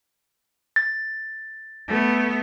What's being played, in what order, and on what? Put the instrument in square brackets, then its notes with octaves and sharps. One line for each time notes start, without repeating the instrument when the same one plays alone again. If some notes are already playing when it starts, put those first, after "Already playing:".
[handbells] A6
[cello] A3 B3